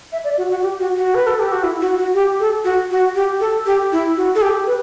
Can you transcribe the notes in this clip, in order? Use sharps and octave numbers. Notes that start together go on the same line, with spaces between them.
E5
D5
F#4
F#4
G4
F#4
F#4
B4
A4
G4
F#4
E4
F#4
F#4
G4
A4
F#4
F#4
G4
A4
G4
E4
F#4
A4
G4
B4